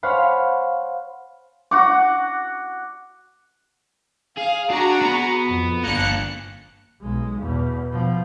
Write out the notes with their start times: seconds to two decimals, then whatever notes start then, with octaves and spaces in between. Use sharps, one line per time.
0.03 C5 C#5 F5 F#5 G#5 B5
1.71 F#4 F#5 D6
4.37 G#4 F5
4.70 D4 F#4 G#4 A#5
5.02 B3
5.46 F2
5.84 G1 A#3 D4 F#6 C#7
7.01 B1 G#3
7.40 E2 B2
7.91 B2 F3